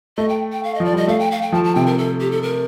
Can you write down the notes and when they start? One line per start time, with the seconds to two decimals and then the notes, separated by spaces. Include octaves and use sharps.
0.17 A3 D#5
0.29 G5
0.52 G5
0.63 F5
0.75 D#5
0.80 F3 D5
0.94 G3 D#5
1.08 A3 F5
1.19 G5
1.31 F5
1.42 G5
1.52 F3 A5
1.64 A5
1.75 C3 G5
1.86 A#4
1.98 A4
2.21 G4
2.31 A4
2.43 A#4